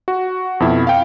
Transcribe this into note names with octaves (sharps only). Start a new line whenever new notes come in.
F#4
F2 B2 E4
F5 G5